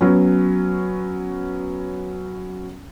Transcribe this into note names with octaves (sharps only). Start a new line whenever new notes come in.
F#3 B3 C#4